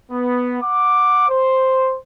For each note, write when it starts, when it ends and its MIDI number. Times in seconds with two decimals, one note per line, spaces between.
0.11 0.58 59
0.62 1.26 78
0.62 1.26 86
1.28 1.97 72